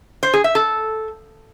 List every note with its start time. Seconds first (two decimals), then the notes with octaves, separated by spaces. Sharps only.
0.23 C5
0.33 G#4
0.44 E5
0.55 A4